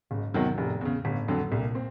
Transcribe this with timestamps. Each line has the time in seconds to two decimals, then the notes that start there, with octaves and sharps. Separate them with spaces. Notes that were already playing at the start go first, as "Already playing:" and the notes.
0.11 F#1 G#2
0.34 E2 C3 D#3 F#3
0.57 F1 A2
0.81 E2 C#3
1.05 G1 A2
1.28 F2 D3 F#3
1.51 C2 A#2
1.75 C4